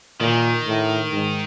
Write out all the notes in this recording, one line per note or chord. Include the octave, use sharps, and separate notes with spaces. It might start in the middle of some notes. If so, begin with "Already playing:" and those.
A#2 D#3
A2
G#2